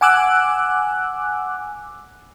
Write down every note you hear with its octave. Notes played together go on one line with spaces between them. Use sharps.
F#5 G#5 D6 E6 F#6